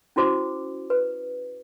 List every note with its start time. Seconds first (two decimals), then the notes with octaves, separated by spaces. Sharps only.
0.16 C#4 E4 F#4 C5 D6
0.90 B4